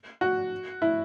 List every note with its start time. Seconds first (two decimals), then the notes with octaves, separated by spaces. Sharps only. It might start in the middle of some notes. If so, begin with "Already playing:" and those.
0.21 F#4
0.82 E4